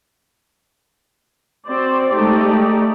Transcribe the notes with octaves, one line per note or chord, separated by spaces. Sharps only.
C4 F#4 C5 D5
G#3 A3 D#4 G4 D5